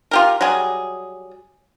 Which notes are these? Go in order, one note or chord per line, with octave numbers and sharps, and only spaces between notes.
F4 G4 A#4
F#3 G3 G#4